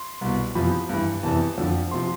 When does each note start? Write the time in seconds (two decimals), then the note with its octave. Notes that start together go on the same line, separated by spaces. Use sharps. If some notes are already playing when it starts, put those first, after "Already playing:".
Already playing: C6
0.21 C2 B2
0.55 E2 C3 F3 B5
0.89 G2 E3
1.23 E2 C3 E3 A5
1.58 F2 D3 F3
1.91 C3 F3 C6